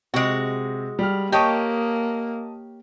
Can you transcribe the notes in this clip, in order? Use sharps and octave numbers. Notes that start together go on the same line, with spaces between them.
C3 G#3 F#4
G3 F6
A#3 G4 C#5 D#5 A5 D#6